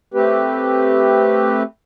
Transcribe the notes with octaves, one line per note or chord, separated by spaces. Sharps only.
A3 C4 G4 B4